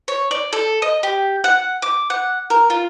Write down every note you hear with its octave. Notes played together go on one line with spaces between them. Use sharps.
C#5
D5
A4
D#5
G4
F#5
D6
F#5
A#4
F4